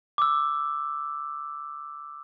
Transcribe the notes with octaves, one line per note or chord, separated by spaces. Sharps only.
D6 E6